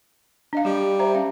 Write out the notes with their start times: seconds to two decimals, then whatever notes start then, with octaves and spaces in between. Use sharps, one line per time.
0.53 D4 D#5 F5
0.65 G3 G4
0.99 C5 E5 A#5
1.15 C#4 F5